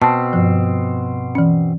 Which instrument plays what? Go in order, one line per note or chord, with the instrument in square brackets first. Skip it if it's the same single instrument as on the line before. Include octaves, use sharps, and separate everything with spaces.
[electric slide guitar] B2 C4 [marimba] A5
[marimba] G2 F3
E3 C#4